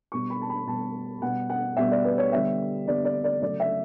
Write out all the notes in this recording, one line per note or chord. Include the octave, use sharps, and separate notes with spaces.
B2 G3 B3 C#6
B5
A5
B5
B2 G3 B3 A5
B2 G3 B3 F#5
F#5
B2 G3 B3 E5
D5
B4
C#5
D3 G3 B3 E5
D3 G3 B3 D5
D5
D5
C#3 F#3 A3 D5
E5